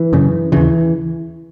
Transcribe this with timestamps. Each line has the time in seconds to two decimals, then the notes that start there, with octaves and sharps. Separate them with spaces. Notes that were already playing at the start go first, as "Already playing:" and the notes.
Already playing: E3
0.13 F#2 C#3
0.52 D#2 C#3 E3